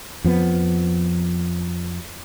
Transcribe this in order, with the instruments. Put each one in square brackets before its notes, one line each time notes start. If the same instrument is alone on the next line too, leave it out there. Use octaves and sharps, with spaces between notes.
[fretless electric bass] F2 F3 A#3 B3